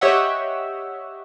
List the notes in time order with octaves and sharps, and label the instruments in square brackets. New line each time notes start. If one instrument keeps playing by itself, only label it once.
[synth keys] G4 C#5 D#5 E5 F#5